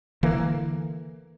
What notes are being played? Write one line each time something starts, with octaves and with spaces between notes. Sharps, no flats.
D3 E3 A#3